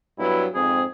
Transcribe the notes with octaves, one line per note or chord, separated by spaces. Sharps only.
G2 F#3 B3 E4
F2 G#2 C4 G#4